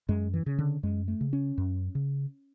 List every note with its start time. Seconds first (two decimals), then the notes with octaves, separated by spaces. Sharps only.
0.09 F#2 G#3
0.34 E3
0.46 C#3
0.58 D3
0.83 F#2 G#3
1.08 A3
1.21 C#3
1.33 C#4
1.58 F#2
1.95 C#3